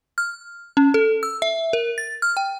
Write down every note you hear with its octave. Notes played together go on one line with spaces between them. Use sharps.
F6
C#4
A4
E6
E5
A#4
A6
F6
G5